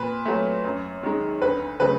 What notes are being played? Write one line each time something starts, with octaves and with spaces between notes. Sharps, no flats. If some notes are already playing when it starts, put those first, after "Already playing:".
Already playing: A#2 B4
F#3 A3
F#2
D#3 G#3
D2 B4
C#3 F#3 A3 B4